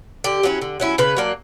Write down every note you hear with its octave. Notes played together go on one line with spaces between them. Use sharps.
D3 G4
F#3 C#4 E4
D3
F#3 C#4 E4
C#3 B4
F#3 A#3 D4